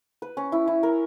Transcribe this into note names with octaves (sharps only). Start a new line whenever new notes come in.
B4
C#4
E4
E4
A#4